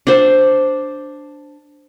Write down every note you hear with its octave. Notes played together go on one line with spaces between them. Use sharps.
D4 C5